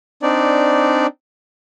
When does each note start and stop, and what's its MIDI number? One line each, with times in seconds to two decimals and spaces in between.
0.22 1.07 60
0.22 1.07 62
0.22 1.07 63
0.22 1.07 74